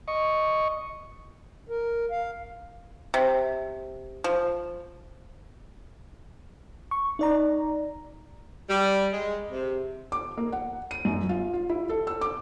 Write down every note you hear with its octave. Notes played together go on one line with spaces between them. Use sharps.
D#5 C#6
A#4
F5
C3
F3
C#6
D#4 D5 A#5
G3
G#3
C3
D6
A#3
F#5
D#7
F#2
F4
F4
E4
A4
E6
D6